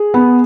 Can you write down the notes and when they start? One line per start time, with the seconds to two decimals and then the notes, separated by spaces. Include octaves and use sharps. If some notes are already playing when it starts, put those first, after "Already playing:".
Already playing: G#4
0.14 B3